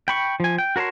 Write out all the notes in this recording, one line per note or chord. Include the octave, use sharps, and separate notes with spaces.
G5 B5 C#6
F3 G#5
G5
F#4 A#4 C#5 A5 C6